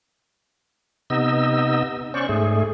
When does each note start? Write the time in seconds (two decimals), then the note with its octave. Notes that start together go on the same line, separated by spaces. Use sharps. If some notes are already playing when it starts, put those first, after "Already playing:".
1.10 C3 B3 D#4 D#5 E6
2.14 C#4 C5 D5 C#6
2.29 G#2 A3 G#4